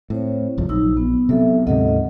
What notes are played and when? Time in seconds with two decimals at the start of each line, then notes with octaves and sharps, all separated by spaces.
0.10 A2 C4 C5 C#5
0.58 G1 C2 F3
0.69 A#1 F#3 D#4 E6
0.97 B3
1.29 C3 F#3 B3 A4 E5
1.67 D2 G#2 C3 A4 D#5 F#5